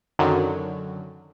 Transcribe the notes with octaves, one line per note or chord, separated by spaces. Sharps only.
F#2 D3 D#3 F#3